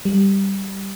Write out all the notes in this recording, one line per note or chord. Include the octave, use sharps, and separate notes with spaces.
G3